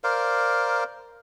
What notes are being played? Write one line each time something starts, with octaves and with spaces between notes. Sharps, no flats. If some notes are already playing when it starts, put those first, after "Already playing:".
A#4 C5 D5 F5